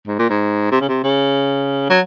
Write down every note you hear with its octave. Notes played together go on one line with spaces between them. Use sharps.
G#2
A#2
G#2
C3
C#3
C3
C#3
F#3